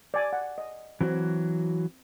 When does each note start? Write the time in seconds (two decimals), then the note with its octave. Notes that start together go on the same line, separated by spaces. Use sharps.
0.14 D5 G#5
0.33 F#5
0.58 D#5
1.01 E3 F#3 C4 F#4